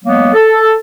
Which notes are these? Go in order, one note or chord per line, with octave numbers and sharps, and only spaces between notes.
F#3 G#3 A#3 B3
A4